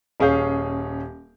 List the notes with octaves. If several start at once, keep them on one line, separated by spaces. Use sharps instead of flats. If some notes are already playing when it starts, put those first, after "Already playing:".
D#1 C#4 G#4 F5 G6